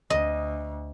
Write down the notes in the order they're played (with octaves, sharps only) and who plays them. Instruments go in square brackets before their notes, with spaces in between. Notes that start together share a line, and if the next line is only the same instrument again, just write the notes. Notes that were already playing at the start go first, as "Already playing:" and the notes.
[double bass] D2 [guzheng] D#5